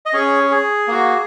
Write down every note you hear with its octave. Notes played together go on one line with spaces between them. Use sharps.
D#5
C#4 G#4 C#5
G#4
A#3 F#4